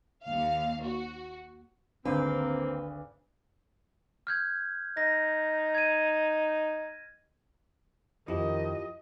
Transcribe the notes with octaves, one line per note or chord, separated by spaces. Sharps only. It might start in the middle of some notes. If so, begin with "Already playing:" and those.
D#2 F5
F#4
G#1 D2 A#3 C4 D4 B4
F6 G6 G#6
D#4 A#6
G#6 D#7
F2 D#3 E4 F4 G4 D#5